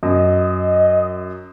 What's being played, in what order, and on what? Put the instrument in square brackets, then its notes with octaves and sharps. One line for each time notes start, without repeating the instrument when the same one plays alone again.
[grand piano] F#2 [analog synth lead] D#5